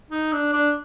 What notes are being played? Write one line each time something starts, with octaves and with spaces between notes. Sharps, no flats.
D#4
D4
D4